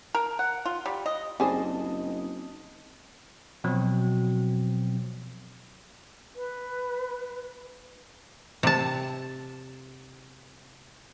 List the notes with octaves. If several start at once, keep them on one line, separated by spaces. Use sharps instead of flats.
A#4
F#5
F4
G3
D#5
F#1 G3 C4 D#4 G#4 C5 D#5 A5
B2 F3 F#3 C4
B4
C3 A5